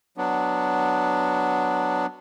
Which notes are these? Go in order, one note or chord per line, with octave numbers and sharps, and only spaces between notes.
F#3 B3 D4